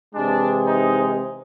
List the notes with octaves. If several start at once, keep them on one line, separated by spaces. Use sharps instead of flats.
C3 E3 G#3 D4
D#4